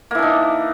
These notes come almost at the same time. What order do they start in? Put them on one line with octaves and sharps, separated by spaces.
A#3 E3 D4 D#4